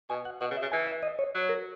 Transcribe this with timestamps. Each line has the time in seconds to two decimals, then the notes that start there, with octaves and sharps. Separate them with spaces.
0.10 B2 G#5
0.25 F#5
0.41 B2 F#5
0.51 C#3
0.57 E5
0.62 C#3
0.72 E3 G#5
0.87 E5
1.03 D#5
1.19 C#5
1.34 F#3
1.49 A#4